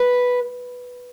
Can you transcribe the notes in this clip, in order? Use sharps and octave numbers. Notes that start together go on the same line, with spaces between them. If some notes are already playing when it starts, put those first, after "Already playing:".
Already playing: B4